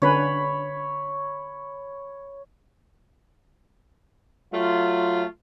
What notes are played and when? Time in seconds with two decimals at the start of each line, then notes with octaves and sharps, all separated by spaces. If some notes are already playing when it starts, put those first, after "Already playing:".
0.02 D3 C#4 B4 C#5 B5
4.54 F#3 A3 F4